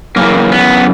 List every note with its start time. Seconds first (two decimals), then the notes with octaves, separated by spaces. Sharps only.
0.16 F#2 C#3 E3 A#3
0.52 B3